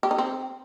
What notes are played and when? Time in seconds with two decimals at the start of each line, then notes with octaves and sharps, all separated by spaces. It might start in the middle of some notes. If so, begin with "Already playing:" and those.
0.03 G4
0.11 D#4
0.18 C4